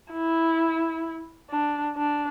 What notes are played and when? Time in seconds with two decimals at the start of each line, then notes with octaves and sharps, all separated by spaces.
0.12 E4
1.49 D4
1.96 D4